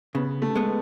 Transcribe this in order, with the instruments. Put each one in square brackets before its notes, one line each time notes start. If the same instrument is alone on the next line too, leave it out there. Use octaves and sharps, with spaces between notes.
[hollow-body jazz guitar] C#3 [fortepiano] B3
[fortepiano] A3
[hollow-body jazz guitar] G#3 B3